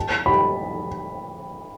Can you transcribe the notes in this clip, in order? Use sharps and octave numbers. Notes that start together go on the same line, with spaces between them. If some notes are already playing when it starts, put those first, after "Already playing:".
Already playing: A5
B5